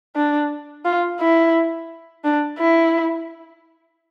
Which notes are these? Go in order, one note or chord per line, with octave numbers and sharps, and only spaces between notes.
D4
F4
E4
D4
E4